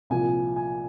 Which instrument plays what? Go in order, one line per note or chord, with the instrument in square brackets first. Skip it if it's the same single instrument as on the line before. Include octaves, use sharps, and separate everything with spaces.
[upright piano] C2 A#2 F3 G#5
G#5